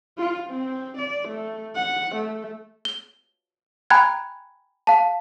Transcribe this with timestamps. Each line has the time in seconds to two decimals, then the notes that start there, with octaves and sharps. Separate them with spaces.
0.18 F4
0.50 C4
0.98 D5
1.29 A3
1.75 F#5
2.16 A3
2.85 G7
3.90 G5 G#5 A#5 B5 F#6 G#6
4.87 F5 A5